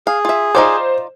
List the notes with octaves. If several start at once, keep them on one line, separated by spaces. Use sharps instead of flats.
G#4 F5
F4 E5
D#4 F4 C5 D5